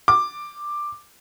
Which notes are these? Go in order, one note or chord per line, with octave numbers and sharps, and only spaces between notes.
D6